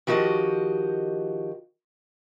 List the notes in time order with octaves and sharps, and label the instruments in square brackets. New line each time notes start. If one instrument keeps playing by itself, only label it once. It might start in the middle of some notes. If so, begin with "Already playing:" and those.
[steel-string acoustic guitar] D#3 F3 F#4 G4 D#5